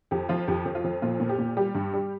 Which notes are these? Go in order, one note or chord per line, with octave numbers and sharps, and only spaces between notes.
F2 G4
F3 F4
F2 G4
F2
F4
F2
A#2 F4
A#2
G4
A#2
G3 G4
G2
G3